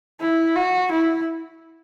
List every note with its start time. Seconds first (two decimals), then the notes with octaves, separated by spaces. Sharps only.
0.20 E4
0.55 F#4
0.91 E4